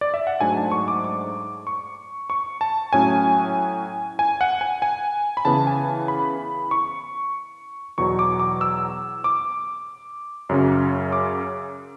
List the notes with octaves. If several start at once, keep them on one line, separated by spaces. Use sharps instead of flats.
D5
E5
F#5
G#2 F#3 A3 D4 G#5
A5
C#6
D6
D6
C#6
C#6
A5
A2 F#3 C#4 G#5
G#5
F#5
G#5
G#5
B5
C#3 E3 B3 A5
G#5
B5
C#6
E2 B2 F#3 C#6
D6
D6
E6
D6
F#2 C#3 F#3 C#4
D6